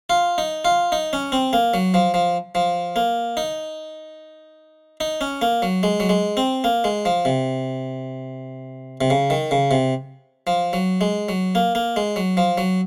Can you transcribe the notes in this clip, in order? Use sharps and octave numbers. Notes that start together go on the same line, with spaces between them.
F4
D#4
F4
D#4
C#4
C4
A#3
F#3
F3
F3
F3
A#3
D#4
D#4
C#4
A#3
F#3
G#3
F#3
G#3
C4
A#3
G#3
F3
C3
C3
C#3
D#3
C#3
C3
F3
F#3
G#3
F#3
A#3
A#3
G#3
F#3
F3
F#3